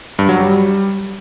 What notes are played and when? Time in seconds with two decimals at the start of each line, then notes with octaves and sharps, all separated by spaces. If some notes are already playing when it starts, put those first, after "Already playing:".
0.19 G2
0.29 F#3
0.39 G3